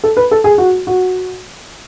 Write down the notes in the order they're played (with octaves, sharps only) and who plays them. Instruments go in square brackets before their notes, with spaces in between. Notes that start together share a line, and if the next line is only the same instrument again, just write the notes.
[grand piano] A4
B4
A4
G#4
F#4
F#4